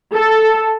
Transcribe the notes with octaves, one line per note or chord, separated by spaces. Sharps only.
A4